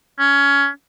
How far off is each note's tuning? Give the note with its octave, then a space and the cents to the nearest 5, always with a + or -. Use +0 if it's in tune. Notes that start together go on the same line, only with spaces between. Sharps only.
C#4 +20